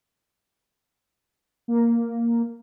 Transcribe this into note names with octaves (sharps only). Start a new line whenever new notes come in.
A#3